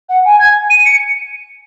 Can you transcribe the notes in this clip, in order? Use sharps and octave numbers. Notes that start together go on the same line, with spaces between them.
F#5
G#5
G#6
D#7
C#7